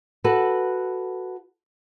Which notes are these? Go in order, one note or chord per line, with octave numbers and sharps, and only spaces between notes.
F#4 A4 B4